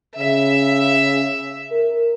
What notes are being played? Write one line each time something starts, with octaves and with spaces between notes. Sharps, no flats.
C#3 E5
A#4